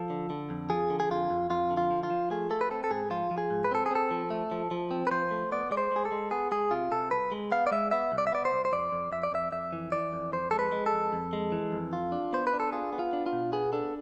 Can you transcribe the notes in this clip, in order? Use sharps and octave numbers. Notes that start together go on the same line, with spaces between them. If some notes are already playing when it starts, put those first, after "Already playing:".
Already playing: F3 A4
D3
D3
F2
F3 G#4
D3
G#4
F2 F4
F2
F2 F4
D3
F4
F3
F4
F3
A3 G#4
A3 A4
B4
C4 A4
A4
G#2 G#4
F3 F4
F3
G#4
G#2
B4
C4 A4
G#4
C4 A4
F3
A3
F3
F3
C4
B4
F3 C5
A3
B3 D5
G#3 D5
C5
G#3 G#4
A4
G#3
B3 G#4
G#3 G#4
C3 F4
C3 A4
C2 B4
G#3
B3 F5
D5
G#3 E5
B3 E5
C2
D5
E5
B3 D5
C5
C2
C5
F2 D5
F2
F2 E5
D5
F2 E5
F2 E5
E3
E3 D5
F2
F2 C5
G#3 A4
B4
G#3
A4
F2
F2
G#3
E3
F2
F4
D4
B3 C5
B4
D4
A4
F4 G#4
B3
F4
D4
F4
B2
B3 G#4
D4 A4